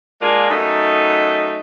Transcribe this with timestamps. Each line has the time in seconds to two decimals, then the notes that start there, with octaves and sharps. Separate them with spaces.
0.22 G#3 A#3 D4 F4 G#4
0.50 F#2 A3 D#4